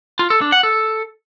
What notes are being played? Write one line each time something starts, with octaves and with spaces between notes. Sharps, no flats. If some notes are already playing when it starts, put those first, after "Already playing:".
F4
A4
D4
F#5
A4